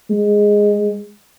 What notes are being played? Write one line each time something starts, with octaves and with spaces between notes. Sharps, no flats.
G#3